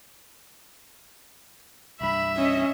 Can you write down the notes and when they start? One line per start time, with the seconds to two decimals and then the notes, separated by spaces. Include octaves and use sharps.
2.01 C2 G2 E5 B5
2.37 C#4 D#5